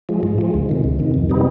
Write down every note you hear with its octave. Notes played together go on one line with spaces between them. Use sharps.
F3 G#3
G#2
F3 G#3
D2
C3 D#3
D2
C3 D#3
F2
C3 G3 B3 D#4